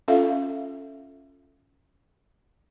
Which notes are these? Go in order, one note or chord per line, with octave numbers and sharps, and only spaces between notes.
C#4 F4 A4 E5 F5